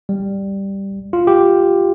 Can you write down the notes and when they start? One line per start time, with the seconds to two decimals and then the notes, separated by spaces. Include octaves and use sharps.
0.09 G3
1.13 F4
1.27 G4